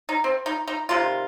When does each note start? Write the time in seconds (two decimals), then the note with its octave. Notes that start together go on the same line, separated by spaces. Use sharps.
0.09 D#4
0.24 C4
0.46 D#4
0.68 D#4
0.89 C3 D#3 G3 A#3 F4